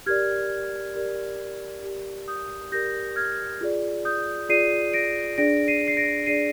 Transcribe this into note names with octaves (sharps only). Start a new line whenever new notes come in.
G4 A#4 D5 F6 G#6
G4 A#4 D5
G4 A#4 D5
D#6 G6
G4 A#4 D5 G6 A#6
F6 G#6
F4 G#4 D5
D#6 G6
F4 G#4 D5 C7 D#7
A#6 D7
D4 G#4 D5 A#6 D7
C7 D#7
C7
A#6 D7
D4 G#4 D5 C7 D#7